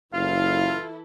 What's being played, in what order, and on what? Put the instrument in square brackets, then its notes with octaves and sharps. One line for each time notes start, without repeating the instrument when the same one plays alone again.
[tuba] F#1 [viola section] E3 E4 A4 [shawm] F4 [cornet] F5